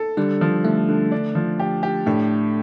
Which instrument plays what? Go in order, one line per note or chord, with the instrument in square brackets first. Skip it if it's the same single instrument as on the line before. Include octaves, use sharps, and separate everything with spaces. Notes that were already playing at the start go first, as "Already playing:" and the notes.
Already playing: [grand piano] A4
[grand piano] D3 [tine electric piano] G3
[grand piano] F3
[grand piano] D3 [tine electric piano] A3
[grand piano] D3
D4
F3
G4
G4
[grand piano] A2 [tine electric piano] A3 D4